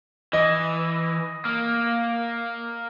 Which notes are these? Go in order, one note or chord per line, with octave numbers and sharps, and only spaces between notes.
E3 D#5
A#3